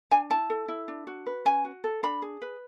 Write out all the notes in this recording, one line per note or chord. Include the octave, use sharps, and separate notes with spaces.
D4 G#5
E4 A5
A4
E4
D4
F#4
B4
C#4 G#5
F#4
A4
D4 B5
G#4
B4